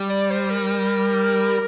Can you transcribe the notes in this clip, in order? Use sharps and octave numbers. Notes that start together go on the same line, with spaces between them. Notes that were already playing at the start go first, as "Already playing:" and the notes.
Already playing: G3
D5
C5
A#4